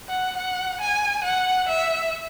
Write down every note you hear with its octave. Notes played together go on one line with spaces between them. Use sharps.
F#5
F#5
G#5
F#5
E5